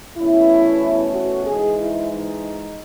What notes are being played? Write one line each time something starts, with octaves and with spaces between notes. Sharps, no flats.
E2 B2 A3 C#4 E4
F#4
G#2 E3 G#3 D#4 G#4
E4
D#4